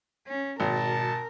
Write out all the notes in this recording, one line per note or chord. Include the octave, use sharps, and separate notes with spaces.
C#4
G#1 B2 A#4 A5